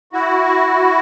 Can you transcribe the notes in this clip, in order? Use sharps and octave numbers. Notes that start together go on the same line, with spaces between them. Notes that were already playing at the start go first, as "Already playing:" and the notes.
E4 F#4